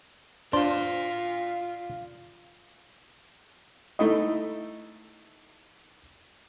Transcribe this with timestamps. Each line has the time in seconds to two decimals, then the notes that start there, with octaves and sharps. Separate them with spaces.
0.53 D4 F4 C5 D5 F5 C6
3.99 A3 D#4 E4 D#5